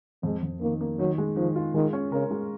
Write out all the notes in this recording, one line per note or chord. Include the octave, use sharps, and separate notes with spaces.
F2 G#3
F2
D#3 A#3
A#3
D#3 F#3
G#3
D#3 F3
F4
D#3 G#3
C#4
C#3 A#4
G#3